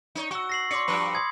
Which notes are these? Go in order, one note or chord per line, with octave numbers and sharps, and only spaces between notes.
D#4 C#5
F#4 C#6 E6
A#6 C7 F#7
C#5 D5 C6 D6 C#7
G2 F3 B4 B5
C6 D#6 G#6